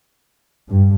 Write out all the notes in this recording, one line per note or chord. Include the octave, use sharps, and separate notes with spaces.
G2